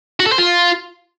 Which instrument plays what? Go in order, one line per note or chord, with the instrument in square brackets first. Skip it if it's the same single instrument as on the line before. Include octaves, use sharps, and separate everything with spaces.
[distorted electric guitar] F#4
A4
C5
F4